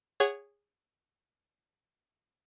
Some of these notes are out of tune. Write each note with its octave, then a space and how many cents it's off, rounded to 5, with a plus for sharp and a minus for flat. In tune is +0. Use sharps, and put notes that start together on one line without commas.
G#4 -20 C#5 +0 F#5 +0